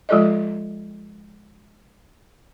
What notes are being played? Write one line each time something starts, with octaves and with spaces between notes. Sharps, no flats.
F3 G#3 F4 A4 D5 D#5